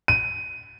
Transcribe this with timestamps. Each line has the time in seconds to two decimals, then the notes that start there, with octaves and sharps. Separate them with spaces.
0.08 D#7